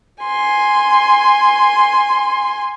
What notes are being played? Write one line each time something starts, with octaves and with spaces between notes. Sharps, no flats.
G#5 C6